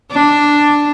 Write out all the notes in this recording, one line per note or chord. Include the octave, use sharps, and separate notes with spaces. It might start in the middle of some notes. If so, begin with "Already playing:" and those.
D4